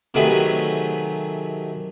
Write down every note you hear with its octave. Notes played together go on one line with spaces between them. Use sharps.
C3 D#3 F#3 A3 G#4 B4